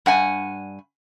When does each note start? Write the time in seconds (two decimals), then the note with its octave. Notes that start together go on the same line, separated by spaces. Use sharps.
0.06 G2 F#5 G#5